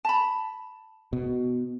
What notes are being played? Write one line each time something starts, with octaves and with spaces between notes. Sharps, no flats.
A5 B5
B2